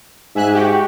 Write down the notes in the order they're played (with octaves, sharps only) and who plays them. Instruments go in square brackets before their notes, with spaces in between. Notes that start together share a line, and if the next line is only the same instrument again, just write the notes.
[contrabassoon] G#2 [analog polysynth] E5 G#5 F#6
[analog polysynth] F#4 G4